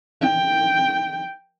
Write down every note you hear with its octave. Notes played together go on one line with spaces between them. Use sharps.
G5